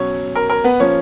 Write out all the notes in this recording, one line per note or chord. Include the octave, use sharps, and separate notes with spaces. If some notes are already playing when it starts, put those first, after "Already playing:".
Already playing: B2 F#3 C#4 C#5
A#4
A#4
B3 B4
F3 A#3 C#4 C#5